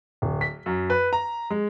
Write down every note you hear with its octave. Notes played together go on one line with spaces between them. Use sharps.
D1
B6
F#2
B4
A#5
G#3